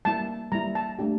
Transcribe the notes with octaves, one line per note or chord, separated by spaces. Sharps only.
G3 A#3 E4 A5
G3 A#3 E4 A#5
A5
A3 D4 G4